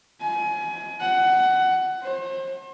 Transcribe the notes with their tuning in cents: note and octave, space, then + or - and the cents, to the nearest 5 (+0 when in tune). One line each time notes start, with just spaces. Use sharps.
G#5 +25
F#5 +15
C5 +40